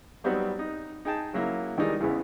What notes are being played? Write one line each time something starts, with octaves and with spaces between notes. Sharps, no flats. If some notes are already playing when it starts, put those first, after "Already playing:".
F#3 G3 B3 C4 D#4 F#4
D#4
D#4 G#4 G5 A5
C#3 F#3 A#3 E4
D#3 E3 G3 G#3 D4 D#4
E2 C#3 E3 B3